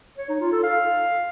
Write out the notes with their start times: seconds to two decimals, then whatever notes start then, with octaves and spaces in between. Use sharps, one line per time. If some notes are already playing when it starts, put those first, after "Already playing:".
0.18 C#5
0.29 D#4
0.41 F4
0.52 A4
0.63 F5